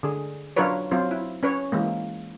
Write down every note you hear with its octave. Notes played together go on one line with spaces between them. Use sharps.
D3 G#4
F#3 D4 F4 A#4 B4 C#5
F#3 C4 F4 C5
E4
C#4 B4 C#5
E3 G#3 A#3